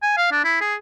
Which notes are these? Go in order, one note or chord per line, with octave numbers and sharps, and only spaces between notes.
G#5
F5
D4
E4
G#4